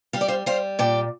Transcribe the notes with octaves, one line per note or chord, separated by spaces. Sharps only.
G3 F5
D5
C5 F5
G3 C5 F5
A#2 D5 G5